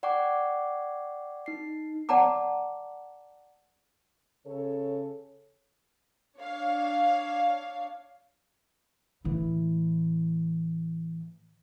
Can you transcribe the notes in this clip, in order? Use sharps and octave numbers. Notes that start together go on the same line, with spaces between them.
D5 F#5 G5 C#6 D6
D#4 C7
D5 F#5 A5 A#5 D6
C#3 A4 C#5
D4 C#5 F5
A2 E3